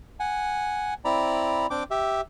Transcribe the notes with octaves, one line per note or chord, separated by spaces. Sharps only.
F#5 G#5
C4 E4 D5 A#5 B5
C4 D4 G5 D6
G4 E5